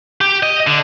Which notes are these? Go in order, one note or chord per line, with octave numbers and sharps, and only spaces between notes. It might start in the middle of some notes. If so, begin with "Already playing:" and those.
G4
D#5
D3